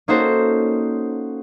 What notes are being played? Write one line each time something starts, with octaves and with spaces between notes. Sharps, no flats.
A#3 C#4 D#4 F#4 A4 C5